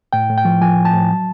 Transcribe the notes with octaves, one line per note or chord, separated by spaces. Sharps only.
A2 G5
A2
G5
F3
F3 G#5
A2
A5
A2
F#3